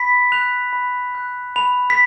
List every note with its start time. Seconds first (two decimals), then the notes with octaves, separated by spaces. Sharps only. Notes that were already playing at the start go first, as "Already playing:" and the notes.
Already playing: B5 B6
0.32 F#6 F7
0.73 B5
1.15 F#6
1.56 B5 F7
1.90 B6